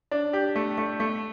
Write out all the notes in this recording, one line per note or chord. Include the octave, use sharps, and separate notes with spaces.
D4
G4
A3
A3
A3